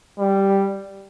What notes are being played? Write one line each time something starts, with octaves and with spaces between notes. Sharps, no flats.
G3